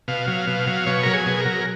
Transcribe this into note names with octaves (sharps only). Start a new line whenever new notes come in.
B2 F5
F#3
B2
F#3
B2 C#5
F#3 A#4
G#4
B2
A#4
F#3